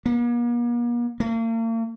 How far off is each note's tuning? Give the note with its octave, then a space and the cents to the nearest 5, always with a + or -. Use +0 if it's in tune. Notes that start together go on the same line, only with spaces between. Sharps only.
A#3 +45
A#3 -40